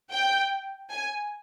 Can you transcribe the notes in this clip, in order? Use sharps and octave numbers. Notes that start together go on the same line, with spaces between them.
G5
G#5